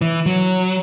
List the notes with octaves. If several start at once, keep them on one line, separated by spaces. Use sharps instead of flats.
E3
F#3